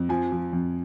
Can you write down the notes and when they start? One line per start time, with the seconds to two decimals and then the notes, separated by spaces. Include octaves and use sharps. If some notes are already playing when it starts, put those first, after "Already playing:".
Already playing: F2
0.09 F3 G#5
0.32 F3
0.53 F2